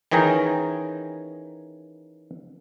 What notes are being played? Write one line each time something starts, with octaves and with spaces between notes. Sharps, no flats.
D#3 E3 C#4 G#4 G5 A#5